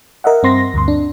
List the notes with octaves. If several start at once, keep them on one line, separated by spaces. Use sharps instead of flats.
A#4 D#5 E5 F#5
G2 C4 C6 A#6
D2 G2 C6
D4